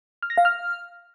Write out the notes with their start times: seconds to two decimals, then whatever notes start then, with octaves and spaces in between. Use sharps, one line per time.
0.23 F6
0.30 A#6
0.38 F5
0.45 F6